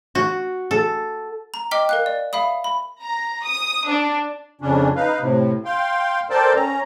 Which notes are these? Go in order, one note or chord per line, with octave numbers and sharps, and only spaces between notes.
F#4
A4
A#5
D#5 G5 D6 F6 B6 G7
A#4 F5 F#6
D5
E5 F5 B5 D#6
B5
A#5
D#6
D4
F2 C#3 C#4 D4
D#4 B4 F5
A2 C3
F5 G5 C6
A4 A#4 C5 D5 G5 A5
C#4 A#5